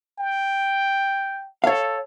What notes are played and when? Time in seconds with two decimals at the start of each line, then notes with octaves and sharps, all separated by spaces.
0.19 G5
1.64 A4 C#5 F5